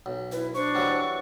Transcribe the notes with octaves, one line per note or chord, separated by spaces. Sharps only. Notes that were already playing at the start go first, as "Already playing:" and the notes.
B1
E4 B4
D4 C5 C#6
E3 F#3 G3